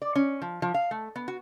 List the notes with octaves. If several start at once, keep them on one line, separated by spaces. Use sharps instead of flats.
D5
C#4
F3
F3
F5
A3
B3
F#4